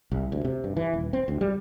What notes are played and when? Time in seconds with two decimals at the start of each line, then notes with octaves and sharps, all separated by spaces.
0.12 C2
0.32 D2
0.45 C3
0.64 G2
0.77 E3
0.94 D#1
1.13 C4
1.28 D2
1.41 G3